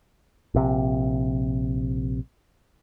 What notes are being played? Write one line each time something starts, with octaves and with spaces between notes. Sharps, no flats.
A#1 C3